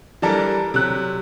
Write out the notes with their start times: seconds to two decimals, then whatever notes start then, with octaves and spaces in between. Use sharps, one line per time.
0.22 E3 G3 D4 A4 A#4
0.74 C3 F#3 F#6